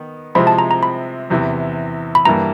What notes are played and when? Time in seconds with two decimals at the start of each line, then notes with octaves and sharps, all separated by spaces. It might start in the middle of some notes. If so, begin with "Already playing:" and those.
Already playing: D#3 B3
0.35 C3 F3 G#3 C4 E4 B5
0.47 A5
0.59 A#5
0.71 A#5
0.83 B5
1.30 E2 C3 E3
2.15 B5
2.25 G2 E3 G3 A#3 A#5